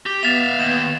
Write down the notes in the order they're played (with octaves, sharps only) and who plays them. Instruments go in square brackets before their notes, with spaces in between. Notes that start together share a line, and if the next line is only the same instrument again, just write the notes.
[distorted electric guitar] G4
[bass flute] B3 [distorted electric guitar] E5 F5 [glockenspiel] A6 E7 F7
[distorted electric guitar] D#2 [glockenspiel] E7